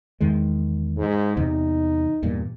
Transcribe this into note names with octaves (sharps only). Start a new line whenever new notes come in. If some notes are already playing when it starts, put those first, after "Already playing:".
E2 D#3 G#3
G#2
E2 C3 D#4
E2 G2 A#2